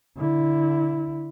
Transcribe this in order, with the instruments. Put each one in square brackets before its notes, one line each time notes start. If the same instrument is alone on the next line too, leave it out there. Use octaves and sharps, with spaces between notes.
[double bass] D3 E4